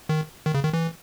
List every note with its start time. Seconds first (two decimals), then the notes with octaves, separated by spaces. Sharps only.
0.09 D#3
0.46 D#3
0.54 C#3
0.64 D#3
0.73 E3